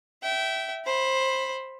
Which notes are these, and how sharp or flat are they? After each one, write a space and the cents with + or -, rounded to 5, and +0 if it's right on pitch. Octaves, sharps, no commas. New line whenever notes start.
E5 +0 G5 -25
C5 +15 B5 +0